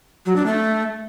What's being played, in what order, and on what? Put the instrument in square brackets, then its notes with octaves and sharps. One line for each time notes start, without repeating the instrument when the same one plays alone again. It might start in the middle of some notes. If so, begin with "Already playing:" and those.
[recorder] F#3
D4
A3